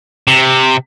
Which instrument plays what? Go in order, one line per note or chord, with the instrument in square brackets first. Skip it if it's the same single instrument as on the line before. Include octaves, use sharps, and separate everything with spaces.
[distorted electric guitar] C3